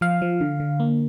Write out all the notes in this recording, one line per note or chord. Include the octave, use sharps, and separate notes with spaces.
F3 F5
F3
D3
D3
A#3